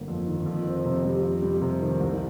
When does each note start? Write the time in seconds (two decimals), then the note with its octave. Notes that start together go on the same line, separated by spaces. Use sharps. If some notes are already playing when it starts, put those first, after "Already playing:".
Already playing: G1 A#3
0.08 F2
0.27 D#3
0.46 F2
0.66 C4
0.85 C3
1.05 G3
1.23 F2
1.42 G3
1.61 C3
1.81 D#3
2.00 C2